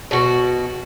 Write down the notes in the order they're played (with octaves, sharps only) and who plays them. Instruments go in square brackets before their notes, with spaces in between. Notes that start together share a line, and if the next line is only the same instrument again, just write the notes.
[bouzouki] B2 F#4